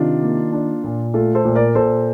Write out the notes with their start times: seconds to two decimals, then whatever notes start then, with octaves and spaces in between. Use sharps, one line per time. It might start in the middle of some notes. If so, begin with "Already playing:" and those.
Already playing: C3 D#3 D4 F4
0.23 A#3
0.53 D4
0.84 A#2
1.14 A3 F4 A4
1.35 A4 C5
1.45 A#2
1.55 A#4 D5
1.75 A#2 A4 C5